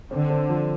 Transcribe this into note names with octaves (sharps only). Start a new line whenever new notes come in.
D3 C4
C4
F3